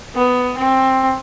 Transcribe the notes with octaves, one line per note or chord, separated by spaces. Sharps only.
B3
C4